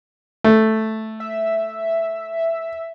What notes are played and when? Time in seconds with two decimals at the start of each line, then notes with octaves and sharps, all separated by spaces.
0.44 A3
1.20 E5